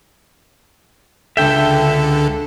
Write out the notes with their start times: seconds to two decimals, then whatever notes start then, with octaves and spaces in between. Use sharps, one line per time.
1.37 C#2 D3 A4 E5 G5